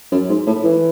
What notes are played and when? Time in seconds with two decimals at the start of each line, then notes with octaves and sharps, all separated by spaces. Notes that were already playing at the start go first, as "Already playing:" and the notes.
0.12 F#2
0.29 G#2
0.47 A2
0.64 E3